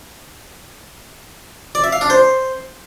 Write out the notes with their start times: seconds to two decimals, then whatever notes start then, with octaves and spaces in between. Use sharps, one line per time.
1.75 D5
1.84 E5
1.93 F5
2.01 D4
2.10 C5